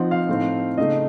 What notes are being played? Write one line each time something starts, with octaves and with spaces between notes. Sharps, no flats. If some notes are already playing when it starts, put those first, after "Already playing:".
Already playing: F3 C4 D#4 F#5
F5
A2 A3 C4 D#4
C#3 A3 D#4 D#5